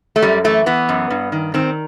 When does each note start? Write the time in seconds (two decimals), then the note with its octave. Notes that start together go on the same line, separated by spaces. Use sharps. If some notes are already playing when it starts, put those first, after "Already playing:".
0.16 A3
0.22 F#2 G3
0.44 E3 A3
0.66 E3 B3
0.89 F#2
1.10 G2
1.32 D#3
1.54 D#3 C4